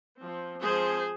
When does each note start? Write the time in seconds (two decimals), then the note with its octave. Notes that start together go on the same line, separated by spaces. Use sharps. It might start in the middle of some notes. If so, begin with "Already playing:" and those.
0.21 F3 C4
0.63 F3 G#3 C4 G#4 C5